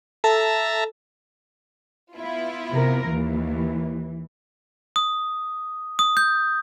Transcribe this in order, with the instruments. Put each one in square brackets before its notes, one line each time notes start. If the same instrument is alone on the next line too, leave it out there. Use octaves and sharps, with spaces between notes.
[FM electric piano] A4 [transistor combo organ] E5 A5 A#5
[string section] B3 E4 F4
[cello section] C3 A#4
[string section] D#2 [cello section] E3
[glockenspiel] D#6
D#6
G6